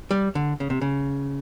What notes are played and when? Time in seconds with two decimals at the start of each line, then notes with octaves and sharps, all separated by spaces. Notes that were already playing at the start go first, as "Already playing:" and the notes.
0.11 G3
0.35 D3
0.60 C#3
0.70 C3
0.81 C#3